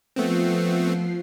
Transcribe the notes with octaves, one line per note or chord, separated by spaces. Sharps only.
F3 A3 B3 C4 C7